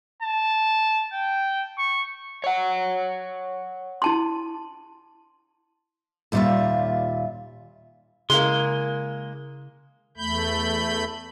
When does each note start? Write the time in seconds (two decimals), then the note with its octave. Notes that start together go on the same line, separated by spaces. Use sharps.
0.23 A5
1.13 G5
1.78 C#6
2.44 C#5 F#5
4.02 E4 A5 C6
6.32 D#2 A#2 G3 A#3 F4 E5
8.30 C#3 G#3 A#3 E4 C6
10.17 E2 A3 B5 G6